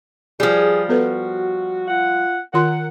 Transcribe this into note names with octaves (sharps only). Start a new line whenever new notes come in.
F3 G3 G#4
B3 F#4 A4 B4
F4 F#5
D#3 F4 A#4 F#5 C6